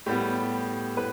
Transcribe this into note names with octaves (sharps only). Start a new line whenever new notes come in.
A2 G3 B3 G4
A2 B4